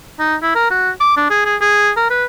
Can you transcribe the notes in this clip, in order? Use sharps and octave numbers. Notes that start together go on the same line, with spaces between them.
D#4
E4
A#4
F#4
D6
D4
G#4
G#4
G#4
A#4
B4